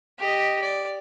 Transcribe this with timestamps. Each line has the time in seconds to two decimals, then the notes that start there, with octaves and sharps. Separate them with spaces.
0.19 G4 D#5
0.62 D5